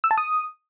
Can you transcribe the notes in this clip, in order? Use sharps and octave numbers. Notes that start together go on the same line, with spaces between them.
E6
A5
D#6